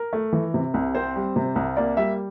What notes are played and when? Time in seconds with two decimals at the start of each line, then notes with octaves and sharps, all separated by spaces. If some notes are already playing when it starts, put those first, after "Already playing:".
Already playing: A#4
0.13 A3
0.33 E3
0.54 C3
0.74 C2
0.95 C4 C5
1.16 G3
1.36 C3
1.56 C2
1.77 A#3 D5
1.97 G3 E5